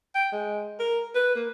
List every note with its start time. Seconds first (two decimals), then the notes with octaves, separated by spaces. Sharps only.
0.15 G5
0.32 G#3
0.79 A#4
1.15 B4
1.35 A#3